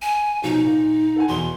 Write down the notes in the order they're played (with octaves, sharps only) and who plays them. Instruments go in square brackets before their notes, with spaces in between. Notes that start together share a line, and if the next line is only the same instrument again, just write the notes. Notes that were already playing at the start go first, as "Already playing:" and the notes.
[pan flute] G#5
[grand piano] B2 F3 F#3 [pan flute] D#4
[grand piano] A#2
A4 F#5 G#5
[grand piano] E2 B2 [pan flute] C6